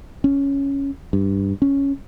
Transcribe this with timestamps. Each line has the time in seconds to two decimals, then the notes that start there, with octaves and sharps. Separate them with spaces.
0.24 C#4
1.13 G2
1.62 C#4